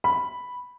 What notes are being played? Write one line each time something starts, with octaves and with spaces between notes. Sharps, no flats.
B5